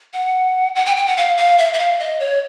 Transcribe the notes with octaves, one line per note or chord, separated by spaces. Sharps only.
F#5
F#5
G5
G5
F#5
F5
F5
E5
E5
F5
D#5
C#5